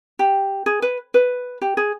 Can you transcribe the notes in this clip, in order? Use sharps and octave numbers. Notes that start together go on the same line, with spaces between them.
G4
G#4
B4
B4
G4
G#4